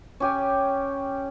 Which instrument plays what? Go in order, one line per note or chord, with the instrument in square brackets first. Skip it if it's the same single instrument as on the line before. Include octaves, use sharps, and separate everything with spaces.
[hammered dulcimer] C#4 G4 G#5